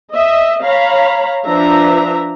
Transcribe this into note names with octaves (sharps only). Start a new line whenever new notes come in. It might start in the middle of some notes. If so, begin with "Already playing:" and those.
D#5 E5
C#5 F5 A#5 B5
F3 D4 B4 E5 A#5